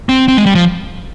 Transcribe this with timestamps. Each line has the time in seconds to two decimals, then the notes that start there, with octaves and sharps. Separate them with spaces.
0.09 C4
0.28 C4
0.37 G#3
0.46 G3
0.55 F3